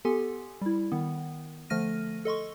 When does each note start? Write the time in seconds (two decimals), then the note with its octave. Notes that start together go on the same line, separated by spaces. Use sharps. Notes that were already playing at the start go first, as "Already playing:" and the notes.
0.05 B3 G4 A4 G#5 C6
0.61 G3 E4
0.92 D#3 B3
1.70 D3 F3 A3 F6 A#6 D#7
2.25 A4 D#5 C6 C#6